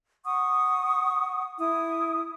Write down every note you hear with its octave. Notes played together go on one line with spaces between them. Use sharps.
F#5 C#6 D#6
E4 D#6